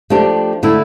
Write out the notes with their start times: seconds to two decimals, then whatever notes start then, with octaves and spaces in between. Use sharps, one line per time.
0.10 F3 A3 D4 G4
0.63 D3 A3 E4